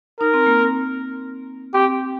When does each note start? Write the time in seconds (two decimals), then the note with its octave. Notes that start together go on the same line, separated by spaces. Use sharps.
0.20 D#4 A#4
0.34 C4
0.46 A#3
0.59 C4
1.74 C4 G4